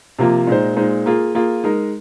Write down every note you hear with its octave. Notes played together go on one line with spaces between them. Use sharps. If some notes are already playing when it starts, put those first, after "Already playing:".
C3 F3 A#3 F4
A#2 G#3 D#4 C5
A#2 G#3 D#4 C5
A#3 F4 G#4
A#3 F4 G#4
G#3 D#4 A#4